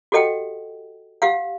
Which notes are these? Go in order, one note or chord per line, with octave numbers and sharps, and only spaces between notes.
F#4 G4 A4 D#5 F#5 G5
G4 F5 F#5